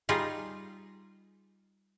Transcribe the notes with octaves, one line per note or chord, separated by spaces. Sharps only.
G3 D#4 F4 G#4